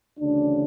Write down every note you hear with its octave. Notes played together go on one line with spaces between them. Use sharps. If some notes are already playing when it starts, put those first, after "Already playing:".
D2 C#3 E3 D4